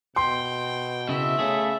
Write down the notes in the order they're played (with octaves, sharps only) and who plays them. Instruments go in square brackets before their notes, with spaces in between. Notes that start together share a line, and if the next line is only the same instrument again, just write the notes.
[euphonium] B2 [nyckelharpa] G5 [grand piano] C6
[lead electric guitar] C#3 E4 [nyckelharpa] E5
[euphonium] C#3 [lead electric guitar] A3 G#4